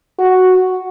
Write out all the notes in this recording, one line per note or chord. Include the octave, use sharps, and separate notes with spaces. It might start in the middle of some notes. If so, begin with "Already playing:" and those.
F#4